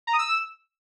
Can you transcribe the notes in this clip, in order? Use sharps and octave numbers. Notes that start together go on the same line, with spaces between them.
A#5
D#6
E6